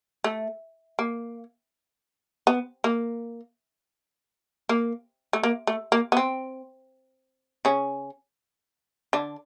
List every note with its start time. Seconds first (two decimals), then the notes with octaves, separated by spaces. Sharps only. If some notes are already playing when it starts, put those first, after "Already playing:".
0.24 A3
0.99 A#3
2.47 B3
2.84 A#3
4.69 A#3
5.33 A3
5.43 A#3
5.67 A3
5.92 A#3
6.12 B3
6.17 C4
7.65 C#3 C#4
9.13 D3 D4